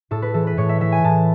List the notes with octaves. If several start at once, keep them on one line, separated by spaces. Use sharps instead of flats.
A2 A4
B4
E3 A4
B4
A2 C#5
E5
E3 E5
G#5
A2 A5